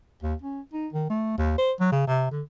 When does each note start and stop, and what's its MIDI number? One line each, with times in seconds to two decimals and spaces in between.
0.23 0.34 39
0.42 0.61 61
0.73 0.88 63
0.93 1.05 51
1.10 1.35 57
1.38 1.57 39
1.58 1.73 72
1.80 1.89 54
1.92 2.07 49
2.07 2.29 48
2.31 2.42 50